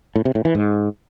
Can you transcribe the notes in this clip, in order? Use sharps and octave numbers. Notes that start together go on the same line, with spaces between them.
A2
C3
A2
E3
G#2